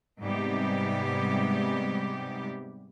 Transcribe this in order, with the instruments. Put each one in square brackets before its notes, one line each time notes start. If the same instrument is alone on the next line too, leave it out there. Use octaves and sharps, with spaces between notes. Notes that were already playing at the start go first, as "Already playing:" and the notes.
[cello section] G#2 C3 G3 G#3 B3 G4